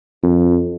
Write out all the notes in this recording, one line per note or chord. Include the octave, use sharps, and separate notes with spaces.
F2